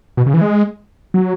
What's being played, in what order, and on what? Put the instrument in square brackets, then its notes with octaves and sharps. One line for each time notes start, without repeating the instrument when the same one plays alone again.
[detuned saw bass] B2
C#3
E3
G#3
F#3